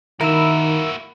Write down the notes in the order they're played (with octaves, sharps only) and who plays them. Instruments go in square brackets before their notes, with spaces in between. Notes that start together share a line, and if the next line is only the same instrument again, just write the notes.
[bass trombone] D#3 [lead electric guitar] A#3 F#4 [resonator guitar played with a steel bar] E4 [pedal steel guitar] A#4 E5